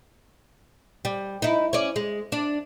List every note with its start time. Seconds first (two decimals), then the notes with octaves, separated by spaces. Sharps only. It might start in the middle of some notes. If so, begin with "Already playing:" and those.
1.05 G3
1.42 D#4 E4
1.73 C#4 D5
1.96 G#3
2.32 D4